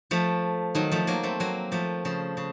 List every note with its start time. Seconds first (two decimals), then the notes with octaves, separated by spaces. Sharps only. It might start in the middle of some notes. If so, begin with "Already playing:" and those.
0.11 F3 A3
0.75 D#3 F#3
0.92 F3 A3
1.07 F#3 A#3
1.23 A3 C4
1.40 F#3 A#3
1.72 F3 A3
2.05 C#3 F3
2.37 C#3